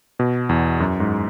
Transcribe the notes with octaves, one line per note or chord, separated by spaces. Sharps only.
B2
E2
F#2
G#2